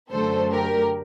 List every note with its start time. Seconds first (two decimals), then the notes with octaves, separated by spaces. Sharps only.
0.10 F#2 D3 F#3 A3 A4 C5
0.52 G4 A#4